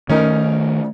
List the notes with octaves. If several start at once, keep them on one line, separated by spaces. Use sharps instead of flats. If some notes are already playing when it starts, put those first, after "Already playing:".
D#3 A3 C#4 D#4 A#4